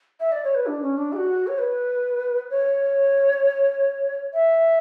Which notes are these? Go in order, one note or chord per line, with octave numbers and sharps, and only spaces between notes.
E5
D5
C#5
B4
D4
C#4
D4
G#4
F#4
C#5
B4
C#5
E5